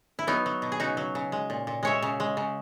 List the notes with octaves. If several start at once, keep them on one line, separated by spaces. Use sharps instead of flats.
E4
F#3 B3 D#4
F#3
B2
G#4
C#3 D#4 F#4
F#3
C#3
G#3
A#2
A#2
G#3 C#5 E5
C#3
G#3
C#3